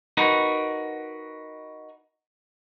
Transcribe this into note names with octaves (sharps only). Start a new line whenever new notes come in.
D#4 F#4 A#4 B4